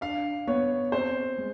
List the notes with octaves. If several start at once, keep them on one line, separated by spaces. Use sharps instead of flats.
D4 F5
B3 C#5
C4 C5
G#3